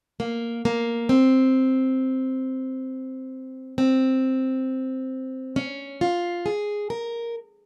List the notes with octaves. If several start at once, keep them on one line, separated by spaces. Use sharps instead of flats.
A#3
A#3
C4
C4
C#4
F4
G#4
A#4